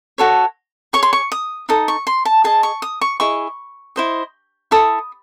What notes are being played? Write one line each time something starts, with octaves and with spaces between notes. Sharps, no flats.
F#4 A4 C#5
G#4 C#5 C#6
C6
C#6
D#6
D#4 A4 D#6
C#6
C6
A5
G#4 D#5 A5
C#6
D#6
C#6
E4 G#4 D#5 C#6
E4 C5 D#5
E4 A4 D#6